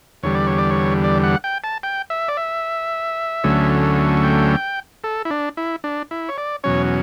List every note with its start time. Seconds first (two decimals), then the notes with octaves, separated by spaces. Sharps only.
0.23 E2 D3 G3 C#5
0.35 D5
0.47 C#5
0.58 D5
0.70 C#5
1.04 D5
1.23 F#5
1.44 G5
1.64 A5
1.83 G5
2.10 E5
2.28 D5
2.37 E5
3.44 D2 D3 F#3 A3 C#4
4.23 G5
5.04 A4
5.25 E4
5.30 D4
5.57 E4
5.84 D4
6.11 E4
6.29 C#5
6.38 D5
6.64 E2 B2 F#3 C#4 C#5